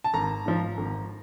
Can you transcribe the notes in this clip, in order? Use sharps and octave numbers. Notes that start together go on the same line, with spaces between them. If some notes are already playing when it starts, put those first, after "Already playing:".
A5
G#1 A#5
G#2 F3
G#1